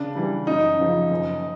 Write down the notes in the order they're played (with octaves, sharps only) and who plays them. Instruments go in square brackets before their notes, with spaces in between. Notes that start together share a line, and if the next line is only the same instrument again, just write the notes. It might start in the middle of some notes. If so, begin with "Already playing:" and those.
Already playing: [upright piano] C#3 [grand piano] D4
[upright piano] E3 G3
[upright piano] F#2 [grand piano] D#4
[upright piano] C#3 F3
F#1